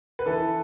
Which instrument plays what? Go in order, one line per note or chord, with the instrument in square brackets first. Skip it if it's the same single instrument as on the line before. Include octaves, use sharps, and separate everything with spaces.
[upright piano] B4
[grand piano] E3 [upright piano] A4